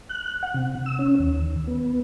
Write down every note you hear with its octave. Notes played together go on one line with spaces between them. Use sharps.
F#6
F#5
C3
E6
C#4
D#2
B3